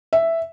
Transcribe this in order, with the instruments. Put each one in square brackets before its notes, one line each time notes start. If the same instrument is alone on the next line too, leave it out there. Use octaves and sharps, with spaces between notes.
[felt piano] E5